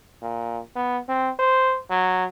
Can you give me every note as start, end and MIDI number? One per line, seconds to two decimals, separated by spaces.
0.22 0.59 46
0.76 0.98 59
1.09 1.30 60
1.39 1.78 72
1.90 2.25 54